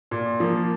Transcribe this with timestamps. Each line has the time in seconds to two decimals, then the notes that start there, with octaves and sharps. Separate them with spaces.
0.11 A#2
0.40 F3 A#3